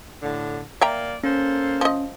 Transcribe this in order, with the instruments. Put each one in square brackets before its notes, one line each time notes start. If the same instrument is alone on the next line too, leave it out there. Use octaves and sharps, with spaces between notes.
[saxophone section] A2 D3
[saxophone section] A#3 D5 [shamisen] E5 G5 A#5
[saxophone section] A#3 A4 C5 [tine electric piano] C#4
[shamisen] F3 D#5